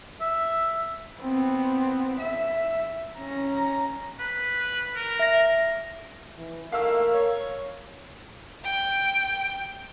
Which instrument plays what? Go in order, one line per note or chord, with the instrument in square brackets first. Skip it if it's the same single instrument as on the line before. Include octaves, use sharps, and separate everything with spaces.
[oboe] E5
[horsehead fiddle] B3 C4
E5
C#4 A#5
[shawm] B4
A#4
[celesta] E5 A#6
[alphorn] E3
[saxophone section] D#3 A3 A#3 [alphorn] A#4 [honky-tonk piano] F5 E6
[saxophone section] C#5
[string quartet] G5